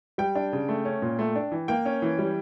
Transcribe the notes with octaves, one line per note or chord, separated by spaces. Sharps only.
G3 G5
D4
C#3
A3
C#4
A#2
A3
D4
E3
A#3 G5
C#4
E3
G3